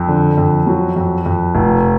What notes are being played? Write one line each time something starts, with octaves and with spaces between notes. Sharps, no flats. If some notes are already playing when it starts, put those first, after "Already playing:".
Already playing: F2
D3
F2
F#3
F2
F2
F1